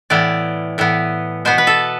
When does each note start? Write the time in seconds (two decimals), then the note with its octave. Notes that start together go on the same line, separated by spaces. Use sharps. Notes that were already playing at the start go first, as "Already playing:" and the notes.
0.10 A2 E3 B3 D5
0.78 A2 E3 B3
1.45 B2 B3 C5
1.58 B4
1.67 A4